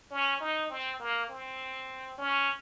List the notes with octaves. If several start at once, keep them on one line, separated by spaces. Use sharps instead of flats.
C#4
D#4
C4
A#3
C4
C#4